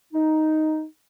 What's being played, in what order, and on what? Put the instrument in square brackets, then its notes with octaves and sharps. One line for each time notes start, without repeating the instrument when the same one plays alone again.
[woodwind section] D#4